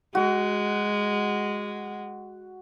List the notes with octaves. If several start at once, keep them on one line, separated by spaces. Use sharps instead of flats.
G#3 F#4